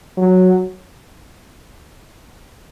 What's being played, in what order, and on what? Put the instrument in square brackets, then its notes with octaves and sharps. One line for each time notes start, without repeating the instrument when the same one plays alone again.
[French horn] F#3